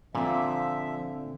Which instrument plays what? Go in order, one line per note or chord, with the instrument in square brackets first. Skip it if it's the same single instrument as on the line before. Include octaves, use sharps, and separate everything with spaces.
[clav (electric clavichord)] A#2 [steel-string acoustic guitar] D3 C4 [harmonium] F3 E5